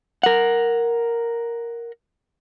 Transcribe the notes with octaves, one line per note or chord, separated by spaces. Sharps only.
A#4 F#5